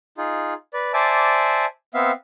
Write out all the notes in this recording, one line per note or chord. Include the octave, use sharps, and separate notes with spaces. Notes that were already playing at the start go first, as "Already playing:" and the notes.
D#4 F4 G#4
B4 D5
C5 D5 E5 G#5 A5 D6
B3 C4 E5 F5